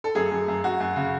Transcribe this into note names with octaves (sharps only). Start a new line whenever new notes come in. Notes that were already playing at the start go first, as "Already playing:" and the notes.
A4
F#2 G#4
F#2
F#2
F#2 F#4
F#2
C#3